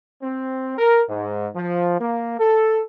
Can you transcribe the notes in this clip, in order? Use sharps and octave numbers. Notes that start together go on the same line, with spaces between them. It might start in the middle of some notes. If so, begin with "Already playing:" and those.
C4
A#4
G#2
F3
A#3
A4